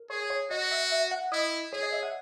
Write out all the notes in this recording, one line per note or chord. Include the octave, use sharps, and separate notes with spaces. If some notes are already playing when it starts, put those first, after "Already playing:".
Already playing: A#4
G#4 C#5
C#5
F#4 D#5
E5
E5
F#5
E4 D#5
G#4 C#5
D#5
E5
F#5